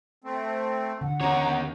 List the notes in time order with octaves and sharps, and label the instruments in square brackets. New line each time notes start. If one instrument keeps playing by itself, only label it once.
[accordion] A3 C4
[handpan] D3 [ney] F#5
[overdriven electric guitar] D#2 C#5 [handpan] C#4 [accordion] A#5